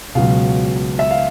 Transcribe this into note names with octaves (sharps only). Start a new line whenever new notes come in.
C#2 B2 F#3 F5
E5
F5